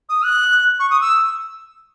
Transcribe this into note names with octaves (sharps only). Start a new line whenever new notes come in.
D#6
F#6
C#6
D#6
E6